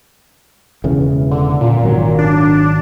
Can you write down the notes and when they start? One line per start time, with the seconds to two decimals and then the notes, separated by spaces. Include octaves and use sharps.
0.84 E1 C#3 E3
1.31 D3
1.61 A#2
1.83 G#1 F#3
2.19 D4